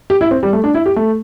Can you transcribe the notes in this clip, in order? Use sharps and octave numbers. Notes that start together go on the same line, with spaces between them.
G4
E4
C4
G3
A3
D4
E4
G4
A3